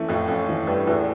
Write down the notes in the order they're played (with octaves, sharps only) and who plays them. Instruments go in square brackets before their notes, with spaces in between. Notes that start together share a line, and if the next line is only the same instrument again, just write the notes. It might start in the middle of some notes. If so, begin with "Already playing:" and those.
Already playing: [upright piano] E3 A3 C#4
[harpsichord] F2 [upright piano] A2
[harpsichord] F2 [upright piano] C#4
[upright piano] E3
[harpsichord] G2 [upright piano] A3
[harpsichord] E2 [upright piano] A2